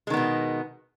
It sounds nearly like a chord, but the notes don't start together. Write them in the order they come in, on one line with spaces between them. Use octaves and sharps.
G#3 D#3 B3 B2